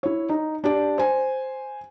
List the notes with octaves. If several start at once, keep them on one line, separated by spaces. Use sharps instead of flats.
E4 C#5
D#4
D4 G4 D5
C5 G#5